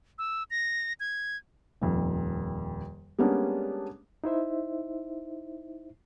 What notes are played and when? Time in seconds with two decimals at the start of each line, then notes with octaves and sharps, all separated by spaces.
0.18 E6
0.51 A#6
1.00 G#6
1.82 D#1 F2
3.19 G3 G#3 A#3 B3 C#4 D4
4.24 D#4 E4 C5 E5